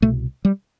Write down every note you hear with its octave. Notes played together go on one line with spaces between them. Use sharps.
C2 B2 A3
G3